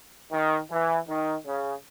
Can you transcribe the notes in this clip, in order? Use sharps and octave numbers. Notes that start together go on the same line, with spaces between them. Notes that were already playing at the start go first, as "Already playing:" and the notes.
D#3
E3
D#3
C#3